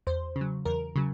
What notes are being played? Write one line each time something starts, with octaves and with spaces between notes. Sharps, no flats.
E2 C5
C#3
F#3
E2 A#4
C#3 F#3